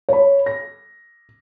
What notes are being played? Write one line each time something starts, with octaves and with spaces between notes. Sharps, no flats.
C#5 B5
A#6